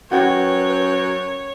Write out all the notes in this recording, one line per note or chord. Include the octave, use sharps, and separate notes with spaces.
F#2 F#4 B4 C#5 G5